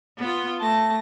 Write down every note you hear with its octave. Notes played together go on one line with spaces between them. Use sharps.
B3 F4
A3 A5 A#6